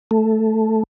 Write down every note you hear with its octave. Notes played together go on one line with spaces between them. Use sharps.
A3